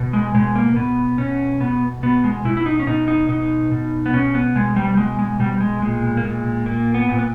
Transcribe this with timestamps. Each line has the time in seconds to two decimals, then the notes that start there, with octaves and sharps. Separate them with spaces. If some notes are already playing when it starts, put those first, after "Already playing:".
Already playing: B2
0.13 G#3
0.35 B2 G#3
0.56 A#3
0.76 B2 B3
1.18 B2 C#4
1.61 B2 B3
2.03 B2 B3
2.24 G#3
2.45 B2 E4
2.57 E4
2.66 D#4
2.80 C#4
2.87 B2 D#4
3.08 D#4
3.29 B2 D#4
3.71 B2
4.06 B3
4.13 B2 C#4
4.35 B3
4.55 B2 G#3
4.76 G3
4.97 B2 G#3
5.19 G#3
5.40 B2 G3
5.61 G#3
5.82 A#2 G#3
6.17 A#3
6.24 A#2 G#3
6.66 A#2 A#3
6.94 B3
7.08 A#2
7.19 B3